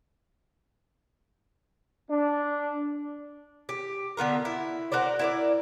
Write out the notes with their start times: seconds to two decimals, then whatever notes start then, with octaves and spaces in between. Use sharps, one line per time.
2.09 D4
3.69 G4
4.17 D3 B3 F4 A#4
4.45 E4
4.92 F#4 A#4 C5 D5
5.19 E4 A#4 D5